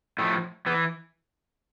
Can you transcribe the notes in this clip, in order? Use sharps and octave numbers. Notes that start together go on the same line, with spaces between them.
A2 F3 A3
E3 B3